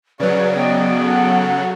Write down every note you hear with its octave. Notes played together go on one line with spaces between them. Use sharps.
C#3 F#3 B4 C#5 D5
B3 D5 D#5 G5
A4 F#5